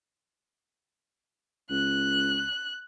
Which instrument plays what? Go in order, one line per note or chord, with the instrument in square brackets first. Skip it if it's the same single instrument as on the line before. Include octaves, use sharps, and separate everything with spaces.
[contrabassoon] C#2 [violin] F#6